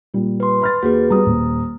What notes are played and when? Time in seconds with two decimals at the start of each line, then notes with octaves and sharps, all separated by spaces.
0.14 A#2 G3
0.40 B4 C6
0.61 B5 F6 A6
0.83 D#2 F#4 G#4 B4
1.10 G3 B3 A#5 D#6
1.26 D#1